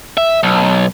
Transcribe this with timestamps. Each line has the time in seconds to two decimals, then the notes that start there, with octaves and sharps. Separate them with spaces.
0.17 E5
0.43 B1